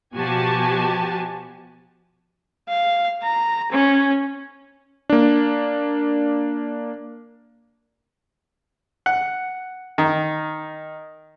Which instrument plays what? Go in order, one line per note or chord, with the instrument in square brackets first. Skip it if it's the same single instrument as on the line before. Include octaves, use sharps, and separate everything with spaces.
[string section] B2 F3 F#4 G4 G#5 A5
[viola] F5
A#5
C#4
[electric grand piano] A#3 D4
[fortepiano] F#5
D#3